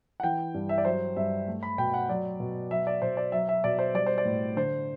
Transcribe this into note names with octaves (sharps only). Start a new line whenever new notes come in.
F#5
E3 G5
G2
E5
D5
F#3 C5
G2 E5
A3
B5
B2 G5
F#5
F#3 D5
B2
F#3 E5
D5
B2 C5
D5
F#3 E5
E5
B2 D5
C5
G3 D5
C5
D5
A2
D3 C5